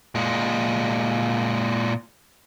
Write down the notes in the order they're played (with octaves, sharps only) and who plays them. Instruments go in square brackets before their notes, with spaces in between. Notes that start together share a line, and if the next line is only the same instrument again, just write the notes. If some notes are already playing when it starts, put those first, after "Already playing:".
[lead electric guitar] A#2 G#3